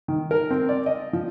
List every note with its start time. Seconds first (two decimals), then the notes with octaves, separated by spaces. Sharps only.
0.08 D#3
0.31 A#4
0.51 C4
0.69 D5
0.86 D#5
1.13 F3